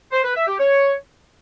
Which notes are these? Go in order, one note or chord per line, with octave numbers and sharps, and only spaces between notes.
C5
B4
E5
G4
C#5